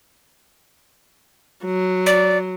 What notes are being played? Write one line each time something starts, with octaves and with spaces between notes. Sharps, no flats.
F#3
D5